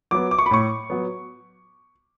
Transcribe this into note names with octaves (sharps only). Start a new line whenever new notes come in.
F#3 B3 D6
D6
C#6
B5
A2 C#6
F#3 B3